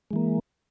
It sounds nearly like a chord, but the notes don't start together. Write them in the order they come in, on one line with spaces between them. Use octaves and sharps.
G#3 E3 A#3